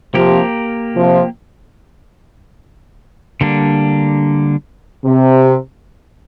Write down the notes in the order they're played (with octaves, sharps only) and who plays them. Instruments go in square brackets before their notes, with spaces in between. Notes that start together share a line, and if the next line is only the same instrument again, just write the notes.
[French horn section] C3 F3 [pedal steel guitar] A#3 G4 A#4
[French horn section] C3 F3
[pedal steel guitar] D3 G3 A#3 D4
[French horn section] C3